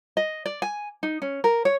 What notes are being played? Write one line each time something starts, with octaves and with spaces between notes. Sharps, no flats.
D#5
D5
G#5
D#4
C#4
A#4
C#5